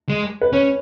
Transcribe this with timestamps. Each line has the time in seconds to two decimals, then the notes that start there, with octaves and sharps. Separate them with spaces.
0.09 G#3
0.41 B4
0.53 C#4 C#5